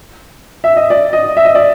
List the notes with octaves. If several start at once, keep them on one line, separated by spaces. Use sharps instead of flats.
E5
D#5
D5
D#5
E5
D#5
D5